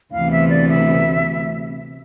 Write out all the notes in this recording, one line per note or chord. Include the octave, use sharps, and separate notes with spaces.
D2 C3 E3 B3 F5
E5
D5
E5